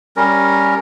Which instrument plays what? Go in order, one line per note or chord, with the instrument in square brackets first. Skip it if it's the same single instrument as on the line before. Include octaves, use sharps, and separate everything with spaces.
[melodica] G3 C#4 A#4